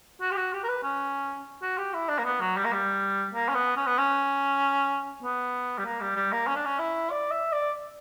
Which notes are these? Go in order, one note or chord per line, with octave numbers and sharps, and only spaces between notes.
F#4
G4
F#4
G4
A#4
B4
C#4
F#4
G4
E4
D4
A#3
B3
F#3
G3
A#3
G3
A#3
C#4
B3
C#4
B3
C#4
B3
G3
A#3
G3
G3
A#3
C#4
D4
C#4
E4
D5
E5
D5